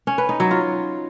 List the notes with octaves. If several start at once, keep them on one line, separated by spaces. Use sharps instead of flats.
C#4
B4
D#4
F#3
F4